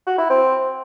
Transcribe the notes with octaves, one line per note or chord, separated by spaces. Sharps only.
F#4
E4
C4